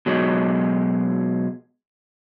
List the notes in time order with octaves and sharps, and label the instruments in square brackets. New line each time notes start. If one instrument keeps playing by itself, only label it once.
[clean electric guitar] B2 F#3 G#3